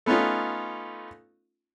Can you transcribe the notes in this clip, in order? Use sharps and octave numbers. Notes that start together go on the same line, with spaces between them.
A3 B3 C#4 D#4 F4